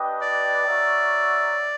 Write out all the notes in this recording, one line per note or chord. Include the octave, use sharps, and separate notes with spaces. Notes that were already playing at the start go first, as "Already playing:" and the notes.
Already playing: D4 G4 B4 D#5 G5
D5
F#4 A#4 C#5 E5